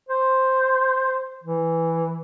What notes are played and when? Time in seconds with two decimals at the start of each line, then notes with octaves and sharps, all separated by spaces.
0.09 C5
1.44 E3